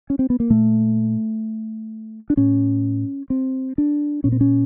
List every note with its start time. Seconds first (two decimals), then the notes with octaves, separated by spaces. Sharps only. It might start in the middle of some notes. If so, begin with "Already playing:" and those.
0.10 C#4
0.19 C4
0.30 B3
0.40 A#3
0.50 A#2 A3
2.30 D4
2.37 A2 C#4
3.30 C4
3.78 D4
4.24 A#2 C#4
4.32 C4
4.41 C#4